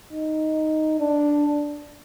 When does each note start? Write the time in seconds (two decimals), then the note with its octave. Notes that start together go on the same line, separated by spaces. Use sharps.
0.12 D#4
1.00 D4